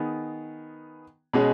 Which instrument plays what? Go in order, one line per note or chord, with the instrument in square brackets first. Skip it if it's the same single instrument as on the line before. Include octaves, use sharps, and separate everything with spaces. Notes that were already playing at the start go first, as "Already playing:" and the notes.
Already playing: [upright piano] D#3 B3 G#4
B2 G#3 C#4 G#4